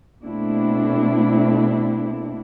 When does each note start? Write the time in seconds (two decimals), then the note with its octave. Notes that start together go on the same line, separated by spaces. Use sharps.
0.23 B2 A3 A#3 C4 D4 E4